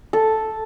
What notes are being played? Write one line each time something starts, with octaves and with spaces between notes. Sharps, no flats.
A4